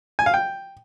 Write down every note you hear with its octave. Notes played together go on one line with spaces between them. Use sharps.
G#5
F5
G5